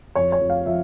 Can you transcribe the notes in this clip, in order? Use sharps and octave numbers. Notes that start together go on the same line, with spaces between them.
F2 C#5
C#5
F2
F5
F3 E5